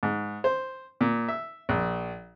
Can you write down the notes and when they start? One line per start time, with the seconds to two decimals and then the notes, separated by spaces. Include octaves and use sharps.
0.03 G#2
0.44 C5
1.01 A#2
1.28 E5
1.69 A#1